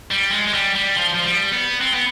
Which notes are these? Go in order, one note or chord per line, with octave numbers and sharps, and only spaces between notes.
G3
G#3
G#3
G3
G3
F3
F3
G3
B3
C4
B3